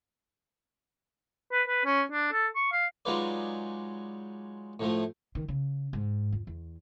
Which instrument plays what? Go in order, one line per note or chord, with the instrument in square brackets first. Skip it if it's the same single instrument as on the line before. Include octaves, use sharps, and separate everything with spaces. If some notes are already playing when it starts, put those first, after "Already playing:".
[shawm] B4
B4
C#4
D4
A4
C#6
F5
[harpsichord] F#3 G#3 D#4 F4 B4 D5
A2 F3 A3
[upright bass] D#3
C#3
G#2
F2
E2